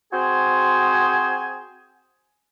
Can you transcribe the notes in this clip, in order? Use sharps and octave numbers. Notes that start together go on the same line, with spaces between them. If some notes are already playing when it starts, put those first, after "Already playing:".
C4 F#4 G#4 C5 G#5